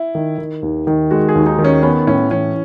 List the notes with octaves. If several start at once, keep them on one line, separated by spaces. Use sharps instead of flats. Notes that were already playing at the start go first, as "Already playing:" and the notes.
Already playing: E4
D#3
D#3
D#2
D#3
G#3 F#4
G#4
D#2
D#4
D#3
C#4
B3 C#4
A2 C#4
E3 C#4